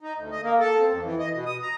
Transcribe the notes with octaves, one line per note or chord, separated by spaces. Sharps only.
D#4
D2
D#5
A#3
A4
C4
F2
E3
D#5
B2
D#6
A#5